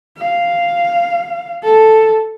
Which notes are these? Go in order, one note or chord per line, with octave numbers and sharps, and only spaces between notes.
F5
A4